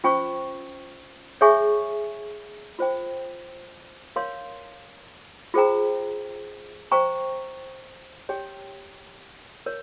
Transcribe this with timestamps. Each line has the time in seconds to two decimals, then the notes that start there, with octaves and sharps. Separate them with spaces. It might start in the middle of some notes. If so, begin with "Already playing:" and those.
0.04 C#4 F4 C5 G5 C#6
1.41 G#4 C#5 E5 G#5 C#6
2.79 F4 C5 G5
4.16 A#4 C#5 F5 C6
5.54 F4 G#4 C5 G5 A#5
6.91 C5 G5 A#5 C#6
8.29 G4 C#5 G5
9.66 A#4 C#5